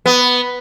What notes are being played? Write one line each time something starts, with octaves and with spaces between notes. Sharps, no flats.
B3